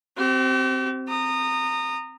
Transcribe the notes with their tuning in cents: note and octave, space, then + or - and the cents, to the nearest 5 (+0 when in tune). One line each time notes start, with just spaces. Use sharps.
C4 +0 G4 -45
A#5 -20 D#6 -20